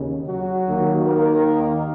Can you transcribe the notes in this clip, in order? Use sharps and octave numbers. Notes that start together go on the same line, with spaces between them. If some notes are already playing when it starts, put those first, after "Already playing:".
Already playing: D#2 C#3
F#3 F#4
D#2 D#3 A#3
A#3 A#4